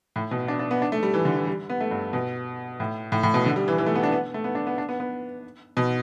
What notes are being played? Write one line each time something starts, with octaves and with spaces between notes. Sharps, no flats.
A2
B2
D4
D4
B3
D4
A3
G3
E3
D3
E3
G3
B3
A3
G2
B2
A2
A2
A2
B2
D3
G3
E3
E3
A3
B3
D4
B3
A3
B3
D4
B3
D4
B3
B3
B2